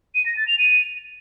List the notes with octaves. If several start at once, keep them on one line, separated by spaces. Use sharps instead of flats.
D#7
A#6
A6
F7
D#7